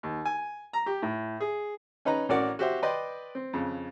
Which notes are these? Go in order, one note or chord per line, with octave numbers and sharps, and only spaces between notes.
D#2
G#5
A#5
G4
A2
G#4
C#4 D#4 B4 A#5
A1 C#4 F#4 A#4 D5 F#5
F#4 G4 C5 E5
B4 D5 D#5 G5 C6
C4
F2 C#3